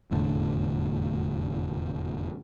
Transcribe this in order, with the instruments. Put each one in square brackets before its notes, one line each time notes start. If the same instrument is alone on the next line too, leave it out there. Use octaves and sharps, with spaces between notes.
[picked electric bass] F1 E2 A2 D3